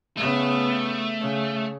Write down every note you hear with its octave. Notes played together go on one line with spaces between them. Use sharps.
C#3 A3 B3
C#3